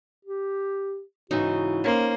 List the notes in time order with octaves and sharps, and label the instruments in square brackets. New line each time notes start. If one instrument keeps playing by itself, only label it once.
[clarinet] G4
[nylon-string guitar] G#2 C#3 E3 [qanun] D#4 [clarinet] F#4
[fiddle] A#3 [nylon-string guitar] C#4 C5